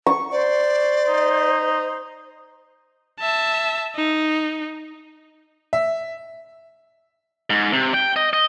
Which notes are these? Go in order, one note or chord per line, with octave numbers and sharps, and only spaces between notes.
C#6
C5 D5
D#4
E5 A5
D#4
E5
G#2
C3
G5
D#5
D#5